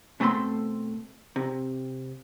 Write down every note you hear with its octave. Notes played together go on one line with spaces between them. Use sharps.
B2 A3 C4 A4 A#5 C6
C3